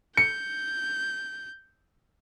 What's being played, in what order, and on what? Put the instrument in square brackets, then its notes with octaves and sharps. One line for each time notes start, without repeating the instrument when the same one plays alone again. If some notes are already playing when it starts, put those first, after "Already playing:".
[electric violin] G6 [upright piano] C#7